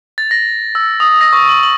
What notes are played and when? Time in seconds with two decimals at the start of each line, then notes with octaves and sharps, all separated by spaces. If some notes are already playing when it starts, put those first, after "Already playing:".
0.18 A6
0.31 A#6
0.75 E6
1.00 D#6
1.21 A#6
1.33 C#6
1.49 F#7
1.63 F#7